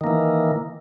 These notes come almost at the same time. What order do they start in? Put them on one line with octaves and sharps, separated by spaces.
D#3 A#3 E3